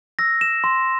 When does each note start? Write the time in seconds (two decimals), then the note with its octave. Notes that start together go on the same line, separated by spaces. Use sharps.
0.19 E6 A#6
0.41 E7
0.64 C6